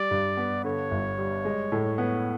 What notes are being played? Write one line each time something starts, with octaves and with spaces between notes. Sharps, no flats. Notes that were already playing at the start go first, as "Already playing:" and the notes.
Already playing: G3 D5
G2
B3
D3 C#5
G1
G3
G#3
A2
B3